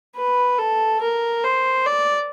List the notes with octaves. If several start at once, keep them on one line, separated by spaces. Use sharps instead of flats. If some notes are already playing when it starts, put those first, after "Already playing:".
B4
A4
A#4
C5
D5